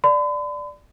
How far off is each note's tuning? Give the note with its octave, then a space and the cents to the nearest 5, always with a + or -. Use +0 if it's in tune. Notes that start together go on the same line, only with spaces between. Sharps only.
D5 +0 B5 +45